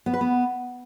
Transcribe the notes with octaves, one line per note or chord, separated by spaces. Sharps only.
B3
B4
B3